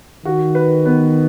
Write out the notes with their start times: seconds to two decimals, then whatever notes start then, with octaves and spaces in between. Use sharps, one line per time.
0.25 D#3 F#4
0.55 B4
0.85 B3